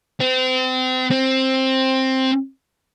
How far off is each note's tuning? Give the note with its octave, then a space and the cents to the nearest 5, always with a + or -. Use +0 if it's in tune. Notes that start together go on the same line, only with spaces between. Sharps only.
C4 -30
C4 +10